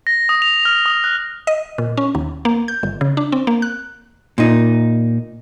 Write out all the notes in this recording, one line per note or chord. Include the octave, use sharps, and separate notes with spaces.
A#6
D#6
F7
F6
D#6
F#6
D#5
A#2
C#4
D#2
A#3
G6
G1
C#3
D4
C4
A#3
F#6
A#2 D#4